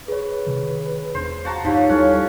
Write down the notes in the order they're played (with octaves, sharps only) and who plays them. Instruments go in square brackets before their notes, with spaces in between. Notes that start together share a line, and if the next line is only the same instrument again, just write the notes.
[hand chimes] G#4 C#5 [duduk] B4
[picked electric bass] C3 D#3
[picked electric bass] E1 D4 [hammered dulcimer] C5
[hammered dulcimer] F#4 A5 A#5
[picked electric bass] D2 G2 [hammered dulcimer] F3 C#5 [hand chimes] D#4 F4 [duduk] G4
[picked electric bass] D#2 G3 [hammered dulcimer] C#4 [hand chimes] E4 A4 F#6